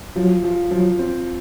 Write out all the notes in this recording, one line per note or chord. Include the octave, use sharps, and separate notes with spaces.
F3 F#3
F3
F3 F#3
C4